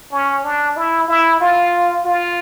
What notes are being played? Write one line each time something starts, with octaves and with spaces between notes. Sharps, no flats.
C#4
D4
E4
E4
F4
F4